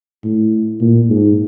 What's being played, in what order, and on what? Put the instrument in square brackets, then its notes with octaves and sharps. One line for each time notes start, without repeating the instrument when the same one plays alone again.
[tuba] A2
A#2
G#2